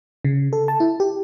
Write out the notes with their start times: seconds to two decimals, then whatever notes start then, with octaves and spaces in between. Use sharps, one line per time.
0.25 C#3
0.53 A4
0.68 A5
0.80 E4
1.00 G4